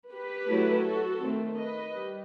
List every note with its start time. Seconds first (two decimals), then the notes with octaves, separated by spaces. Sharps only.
0.12 G4 B4
0.49 F#3 A3 E4
0.85 F#4 A4
1.22 D#3 A3 C4
1.58 B4 D#5
1.94 G3